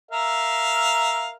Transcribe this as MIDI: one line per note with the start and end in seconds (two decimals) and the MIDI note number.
0.11 1.34 70
0.11 1.34 76
0.11 1.34 77